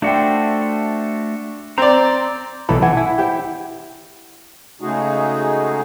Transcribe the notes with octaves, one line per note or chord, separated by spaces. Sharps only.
A3 D4 F#4 C5 E5 G5
C4 D5 A#5
B1 E3 A4 B5
E3 F#5 G#5
E4
G4 C5 G5
C#3 G#3 A3 D#4 F#4 G#4